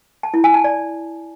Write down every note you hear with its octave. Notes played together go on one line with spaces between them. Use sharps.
A5
E4
G#5
A5
D5